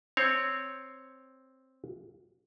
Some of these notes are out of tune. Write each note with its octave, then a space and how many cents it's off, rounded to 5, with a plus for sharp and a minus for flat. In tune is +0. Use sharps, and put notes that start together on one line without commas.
C4 +5 C#5 +0